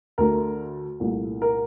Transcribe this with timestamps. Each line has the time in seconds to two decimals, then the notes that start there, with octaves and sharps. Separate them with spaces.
0.18 D2 D3 A3 A#4
1.00 C2 A#2 A3
1.42 A#4